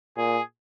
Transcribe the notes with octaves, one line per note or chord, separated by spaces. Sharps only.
A#2 G#4